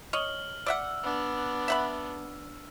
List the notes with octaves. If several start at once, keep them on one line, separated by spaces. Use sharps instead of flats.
C#5 D#5 F6 F#7 G7
D5 E5 F#5 E6
B3 D4
E5 F#5 B5